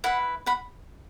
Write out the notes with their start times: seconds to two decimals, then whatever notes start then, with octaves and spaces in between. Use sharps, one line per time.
0.04 E4 B4 F#5
0.46 F#5 B5